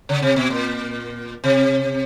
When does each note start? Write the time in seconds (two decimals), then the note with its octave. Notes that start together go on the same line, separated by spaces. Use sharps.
0.09 C#3
0.22 C3
0.36 B2
0.50 A#2
1.44 C3